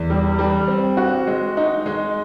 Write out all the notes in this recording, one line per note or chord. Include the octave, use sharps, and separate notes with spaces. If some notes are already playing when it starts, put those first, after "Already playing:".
Already playing: E2
G3
G3
C4
F#4
G#3
D#4
G#3